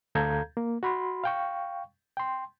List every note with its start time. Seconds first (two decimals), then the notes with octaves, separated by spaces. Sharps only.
0.15 D2 A4 F5 A#5 G6 G#6
0.57 A#3
0.83 F#4 B5 C6
1.24 F5 G5 C#6
2.17 G5 C6